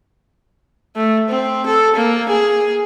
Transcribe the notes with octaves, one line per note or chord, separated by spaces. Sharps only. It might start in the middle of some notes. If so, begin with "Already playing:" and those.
A3
C4
A4
A#3
G#4